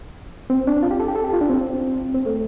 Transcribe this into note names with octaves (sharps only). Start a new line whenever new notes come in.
C4
D4
F4
G4
A4
G4
A4
G4
F4
D4
C4
C4
A3